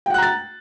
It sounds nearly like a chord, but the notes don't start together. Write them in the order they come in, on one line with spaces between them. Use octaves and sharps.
G5 F#5 F#6 A#5 A6